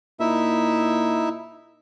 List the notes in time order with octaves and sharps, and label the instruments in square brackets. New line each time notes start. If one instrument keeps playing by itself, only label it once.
[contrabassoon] A#2 [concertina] D#4 E4 E5